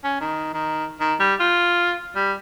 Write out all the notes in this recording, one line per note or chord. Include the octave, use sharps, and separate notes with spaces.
C#4
D#3
D#3
D#3
G3
F4
G3